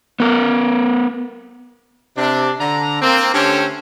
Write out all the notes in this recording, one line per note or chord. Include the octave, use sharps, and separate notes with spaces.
B3 A#4
C3 D4
D3 A#5
A#3 C4
D3 A3 C#4 G4 C5 C#5